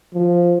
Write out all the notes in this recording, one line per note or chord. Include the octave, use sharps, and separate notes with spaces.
F3